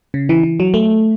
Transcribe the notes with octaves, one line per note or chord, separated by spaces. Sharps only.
C#3
E3
E3
F#3
A3